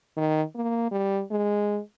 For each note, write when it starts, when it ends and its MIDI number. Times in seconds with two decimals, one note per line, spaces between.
0.17 0.42 51
0.55 0.87 58
0.91 1.22 55
1.31 1.80 56